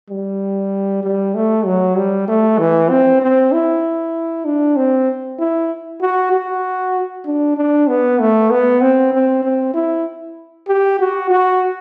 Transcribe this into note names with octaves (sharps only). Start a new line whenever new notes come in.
G3
G3
A3
F#3
G3
A3
E3
C4
C4
E4
D4
C4
E4
F#4
F#4
D4
D4
B3
A3
B3
C4
C4
C4
E4
G4
F#4
F#4